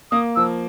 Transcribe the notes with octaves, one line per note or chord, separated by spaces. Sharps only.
A#3 D#6
F3 E6